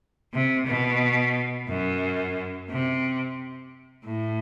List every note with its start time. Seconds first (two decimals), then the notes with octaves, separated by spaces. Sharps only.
0.34 C3
0.67 B2
1.69 F#2
2.70 C3
4.06 A2